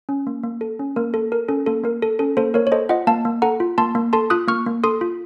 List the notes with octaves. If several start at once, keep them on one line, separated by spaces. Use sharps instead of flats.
C#4
A#3
A#3
A4
C#4
A#3 A#4
A#3 A4
A4 A#4
C#4 A4
A#3 A4
A#3 A#4
A4
C#4 A4
A#3 A4 C5
A#3 A#4 C#5
C#5
A4 C5 D#5
F4 D#5 F#5
A#3 F5 A5
A#3
A4 F#5 A#5
F4
A#3 A5 C6
A#3
A4 A5 C6
F4 D#6 F#6
A#3 C#6 F6
A#3
A4 C6 D#6
F4